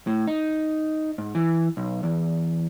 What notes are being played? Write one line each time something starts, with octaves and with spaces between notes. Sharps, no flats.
A2
D#4
G#2
E3
B1
E2